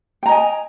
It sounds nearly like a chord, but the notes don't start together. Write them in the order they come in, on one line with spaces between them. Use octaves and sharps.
G5 A#5 D#5 G#5